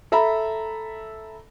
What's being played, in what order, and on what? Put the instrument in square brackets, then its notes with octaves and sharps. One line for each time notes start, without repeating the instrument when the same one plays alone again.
[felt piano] A4 E5 A#5 B5